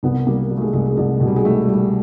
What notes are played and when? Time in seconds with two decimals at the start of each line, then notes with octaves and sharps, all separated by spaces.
0.03 C2 B3
0.27 G3 A#3
0.50 G3
0.57 A3
0.62 G#3
0.73 C2 G#3
0.86 G#3
0.97 C2
1.20 B2
1.28 G3
1.36 G#3
1.44 G3 A3
1.68 G3